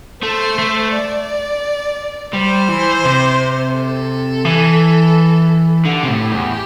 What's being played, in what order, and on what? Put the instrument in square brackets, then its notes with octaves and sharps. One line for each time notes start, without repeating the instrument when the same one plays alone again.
[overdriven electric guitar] A3 [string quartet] C5
[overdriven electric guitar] A3
[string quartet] D5
[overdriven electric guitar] G3 [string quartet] C5
[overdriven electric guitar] E3
C3
[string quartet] A4
[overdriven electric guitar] E3
[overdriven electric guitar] D3 [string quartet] G4
[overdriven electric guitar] C3
A2
E2